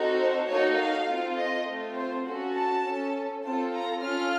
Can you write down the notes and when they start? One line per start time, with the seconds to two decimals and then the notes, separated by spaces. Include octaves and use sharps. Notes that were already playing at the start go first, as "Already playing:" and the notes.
Already playing: C4 D#4 F#4 A4
0.18 C5
0.47 A#3 D#4 F#4 A4 C#5
0.77 F5
1.06 C4 F4 A4
1.36 D#5
1.65 A3 C4 F4
1.95 C5
2.25 C#4 F#4 A4
2.53 A5
2.83 C#4 A4
3.42 C4 F4 A4 A5
3.73 A#5
4.01 C#4 F4 A4 F6